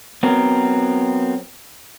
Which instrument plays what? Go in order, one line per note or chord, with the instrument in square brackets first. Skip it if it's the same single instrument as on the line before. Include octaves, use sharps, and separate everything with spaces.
[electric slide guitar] F#3 B3 C4 A#4